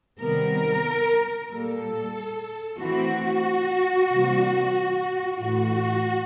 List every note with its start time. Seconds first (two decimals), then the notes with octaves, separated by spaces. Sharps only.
0.19 C3 D#3 G3 B3 A#4
1.50 A#2 G3 A#3 A4
2.79 E3 A3 C4 F#4
4.10 C3 E3 G3 A#3
5.39 A2 E3 A3 F#4